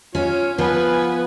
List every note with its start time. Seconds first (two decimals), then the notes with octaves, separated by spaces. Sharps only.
0.15 C#4 F4 C#5
0.58 F3 B3 B4 G#5